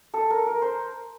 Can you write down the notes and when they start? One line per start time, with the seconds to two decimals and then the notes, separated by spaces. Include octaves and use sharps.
0.14 A4
0.30 A#4
0.46 A#4
0.62 C5